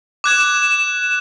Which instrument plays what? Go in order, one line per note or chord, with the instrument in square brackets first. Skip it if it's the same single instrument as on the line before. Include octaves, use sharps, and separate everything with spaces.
[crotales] D6 F#6 G#6 E7